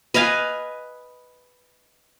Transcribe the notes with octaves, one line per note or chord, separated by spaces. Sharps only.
B4 D#5 F5 G#5